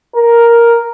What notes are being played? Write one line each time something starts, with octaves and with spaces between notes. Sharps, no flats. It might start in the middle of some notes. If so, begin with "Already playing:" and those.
A#4